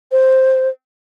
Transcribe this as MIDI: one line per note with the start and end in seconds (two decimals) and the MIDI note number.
0.12 0.68 72